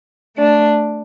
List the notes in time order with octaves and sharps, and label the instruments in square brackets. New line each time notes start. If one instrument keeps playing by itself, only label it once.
[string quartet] A3 D4